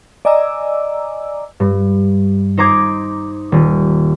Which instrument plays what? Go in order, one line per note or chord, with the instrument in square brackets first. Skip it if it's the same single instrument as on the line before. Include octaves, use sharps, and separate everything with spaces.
[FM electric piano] D5 D#5 G#5 A#5 D6 E6
[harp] G2
D#4 C5 A#5 D6 G#6
D#1